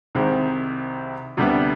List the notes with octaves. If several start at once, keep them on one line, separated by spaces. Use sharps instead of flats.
C2 C3 D#3 G#3 C4
D2 C3 G3 B3 D4